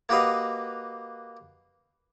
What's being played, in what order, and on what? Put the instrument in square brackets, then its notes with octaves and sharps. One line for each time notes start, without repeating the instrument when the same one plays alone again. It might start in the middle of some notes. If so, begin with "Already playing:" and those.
[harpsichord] A#3 F#4 G4 B4 D#5 F5